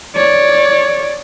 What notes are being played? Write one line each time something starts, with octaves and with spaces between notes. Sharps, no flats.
C#5 D5